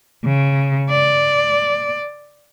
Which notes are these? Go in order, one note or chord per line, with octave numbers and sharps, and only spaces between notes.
C#3
D5